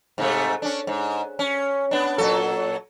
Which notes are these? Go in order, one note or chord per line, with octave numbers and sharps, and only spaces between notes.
G#2 C3 A3
C#4 D4
G#2
C#4
B3 D4
A#2 F#3 A4